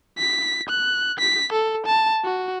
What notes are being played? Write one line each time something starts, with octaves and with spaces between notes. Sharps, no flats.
B6
F#6
B6
A4
A5
F#4